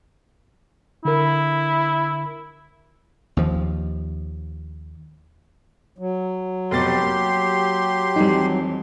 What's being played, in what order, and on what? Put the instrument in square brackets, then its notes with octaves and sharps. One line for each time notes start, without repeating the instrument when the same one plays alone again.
[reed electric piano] D3 A#4 [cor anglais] E4
[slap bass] D#2 F3
[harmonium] F#3
[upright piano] F1 B2 A6 [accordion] G4 C6
[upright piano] A#3
[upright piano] F2 E3 [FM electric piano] G3 D#4